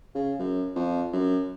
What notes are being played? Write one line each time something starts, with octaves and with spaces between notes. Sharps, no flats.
C#3
F#2
F2
F#2